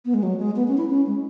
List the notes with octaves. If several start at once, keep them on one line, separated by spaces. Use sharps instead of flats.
B3
G#3
F#3
G#3
B3
C#4
E4
C#4
G#3